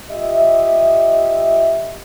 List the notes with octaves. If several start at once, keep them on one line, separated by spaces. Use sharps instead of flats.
F4 G4 D#5 E5